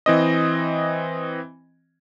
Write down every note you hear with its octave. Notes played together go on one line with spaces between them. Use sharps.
E3 C4 D#5